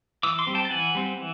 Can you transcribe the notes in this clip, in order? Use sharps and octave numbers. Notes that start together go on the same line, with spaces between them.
E3 D6 E6
C6 D6
G3 C4
G5 A5
A5
E3 F#5 G#5
G3 C4
E3